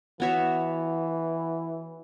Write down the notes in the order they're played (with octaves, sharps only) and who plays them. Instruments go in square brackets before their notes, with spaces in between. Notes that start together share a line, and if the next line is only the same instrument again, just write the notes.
[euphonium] E3 [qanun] B3 F#4 C#5 E5